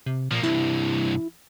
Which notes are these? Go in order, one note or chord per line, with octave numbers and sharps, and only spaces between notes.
C3
A#2 F3 A#3
C2 G2 E4